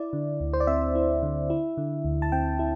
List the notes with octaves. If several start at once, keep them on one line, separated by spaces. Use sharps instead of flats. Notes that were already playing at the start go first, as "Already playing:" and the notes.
Already playing: E4 D5
D3
D2
C5
D5
C4 E5
E4
D3
E4
D3
D2
A5
C4 G5
E4